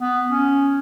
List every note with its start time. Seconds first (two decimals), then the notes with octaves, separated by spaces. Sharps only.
0.01 B3
0.30 C#4